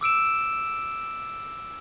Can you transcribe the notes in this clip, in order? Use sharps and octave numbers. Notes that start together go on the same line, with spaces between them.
D6 E6 D7 E7